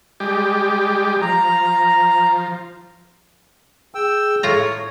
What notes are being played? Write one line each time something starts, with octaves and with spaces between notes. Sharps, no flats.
G3 G#3 G4
F3 A#5
G#4 G5 E6
A2 F4 C#5 A#5